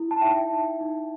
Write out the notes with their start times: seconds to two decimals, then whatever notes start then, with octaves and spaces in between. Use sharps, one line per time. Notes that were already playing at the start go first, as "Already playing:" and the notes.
Already playing: E4
0.11 A5
0.21 D#4 E5 G5
0.51 D#4
0.81 D#4